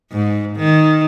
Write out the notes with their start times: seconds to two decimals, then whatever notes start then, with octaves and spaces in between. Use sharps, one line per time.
0.11 G#2
0.56 D#3